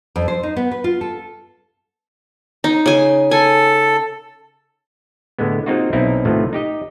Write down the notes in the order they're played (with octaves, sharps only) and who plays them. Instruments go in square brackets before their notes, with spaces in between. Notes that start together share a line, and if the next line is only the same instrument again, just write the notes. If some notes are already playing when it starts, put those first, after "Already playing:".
[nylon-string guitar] F2
C5
D#4
B3
B4
F4
A4
[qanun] D#4
C#3 G#5
[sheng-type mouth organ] A4 [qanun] G#5
[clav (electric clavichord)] A2 D3 G#3 B3
G#3 A#3 C4 D#4 F4 F#4
B1 A#3 C4 D#4 E4 A#4
A2 C3 D#3 F3 A3 B3
D#4 G4 D#5